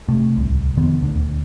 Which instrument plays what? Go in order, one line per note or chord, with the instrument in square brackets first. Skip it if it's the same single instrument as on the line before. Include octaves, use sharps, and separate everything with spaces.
[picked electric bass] C3 A3
D1 C2
F2 D3 D#3 B3
D#1 D2 D3